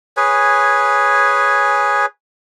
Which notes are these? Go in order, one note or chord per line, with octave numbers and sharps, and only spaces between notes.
G#4 B4 C#5 G#5